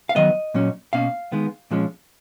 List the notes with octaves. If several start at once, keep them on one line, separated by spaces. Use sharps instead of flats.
F5
D#3 F#3 B3 D#5
A#2 F#3 C#4
B2 A#3 C#4 F5
D#3 G#3 B3
A#2 F3 G#3 C#4